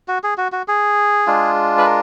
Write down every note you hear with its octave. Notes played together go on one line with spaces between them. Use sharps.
F#4
G#4
F#4
F#4
G#4
G#3 D4 F4
B4
A#4